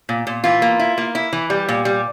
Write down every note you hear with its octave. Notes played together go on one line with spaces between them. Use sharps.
A#2
A#2
E3 F4
A#3
E4
A#3
E4
E3
G3
A#2
G3